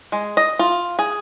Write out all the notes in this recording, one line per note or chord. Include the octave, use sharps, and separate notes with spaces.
G#3
D#5
F4
G#4